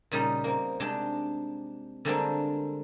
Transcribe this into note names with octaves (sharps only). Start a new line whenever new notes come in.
A#2 C#3 G3 D#4
A#3 C4
C3 G#3 D4 G5
D3 G3 G#3 A#3 C4 D4